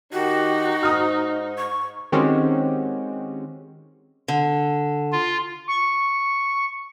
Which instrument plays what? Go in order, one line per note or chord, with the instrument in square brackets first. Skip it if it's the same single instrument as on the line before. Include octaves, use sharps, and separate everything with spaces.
[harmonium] D#3 G4 [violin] D#4 [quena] F#4
[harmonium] G#2 [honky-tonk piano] A#5 D#6 F6
[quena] C#6
[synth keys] D#3 G#3 C4 C#4 F#4 G4
[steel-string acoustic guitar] D3
[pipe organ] F4
[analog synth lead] C#6